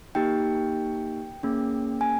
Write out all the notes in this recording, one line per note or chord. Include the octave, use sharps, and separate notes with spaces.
A#3 D#4 G4 G5
A#3 C#4 G#4
G#5